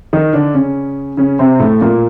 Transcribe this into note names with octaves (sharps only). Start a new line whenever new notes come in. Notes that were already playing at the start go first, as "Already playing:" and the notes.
D#3 D#4
D3 D4
C#3 C#4
C#3 C#4
C3 C4
A2 A3
A#2 A#3